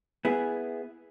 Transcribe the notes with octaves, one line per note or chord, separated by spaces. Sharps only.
B3 E4 G#4